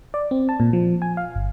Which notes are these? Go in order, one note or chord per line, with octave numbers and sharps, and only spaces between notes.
D5
C4
A5
A#2
F3
G#5
F5
G1